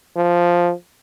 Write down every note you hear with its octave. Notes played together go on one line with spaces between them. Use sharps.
F3